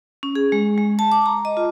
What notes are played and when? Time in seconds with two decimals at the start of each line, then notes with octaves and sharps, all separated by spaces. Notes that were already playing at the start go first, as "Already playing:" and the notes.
0.23 C#4
0.35 G#4
0.52 G#3
0.78 G#3
0.99 A5
1.12 D6
1.26 A#5
1.45 D#5
1.57 F4